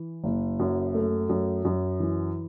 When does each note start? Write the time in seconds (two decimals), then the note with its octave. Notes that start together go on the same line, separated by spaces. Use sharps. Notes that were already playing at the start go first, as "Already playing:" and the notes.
Already playing: E3
0.24 F#1
0.60 F#2
0.94 A3
1.29 F#2
1.65 F#2
2.00 E3